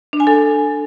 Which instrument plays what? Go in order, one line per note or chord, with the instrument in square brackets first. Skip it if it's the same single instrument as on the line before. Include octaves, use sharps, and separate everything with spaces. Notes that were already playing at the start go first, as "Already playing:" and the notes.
[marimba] D4
G#5
A4